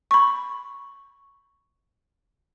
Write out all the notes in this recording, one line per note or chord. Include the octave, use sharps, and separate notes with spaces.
B5 C#6